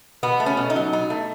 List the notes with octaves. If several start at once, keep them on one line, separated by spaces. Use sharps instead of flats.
B2 B3
A3
C#4
B2
D#4
F#3
B2 D#4
A3